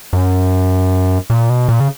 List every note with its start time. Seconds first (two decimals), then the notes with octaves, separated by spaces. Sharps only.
0.13 F#2
1.30 A#2
1.50 B2
1.69 A#2
1.80 C#3